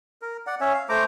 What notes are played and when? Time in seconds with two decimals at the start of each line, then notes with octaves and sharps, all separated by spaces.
0.22 A#4
0.47 D5 F#5
0.61 C#4 C#5 E5
0.73 F5
0.89 A3 C5 A#5 D6